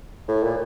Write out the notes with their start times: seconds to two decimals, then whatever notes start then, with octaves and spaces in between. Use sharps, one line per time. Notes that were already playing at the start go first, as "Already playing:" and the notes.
0.28 A2
0.43 A#2